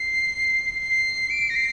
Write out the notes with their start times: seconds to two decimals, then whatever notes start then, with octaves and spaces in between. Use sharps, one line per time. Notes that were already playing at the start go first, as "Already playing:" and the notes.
Already playing: C7
0.80 C7
1.30 D7
1.50 A#6
1.56 C7